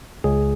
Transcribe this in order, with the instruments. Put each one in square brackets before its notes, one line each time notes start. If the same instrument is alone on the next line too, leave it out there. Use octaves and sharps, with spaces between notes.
[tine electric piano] C#2 G#4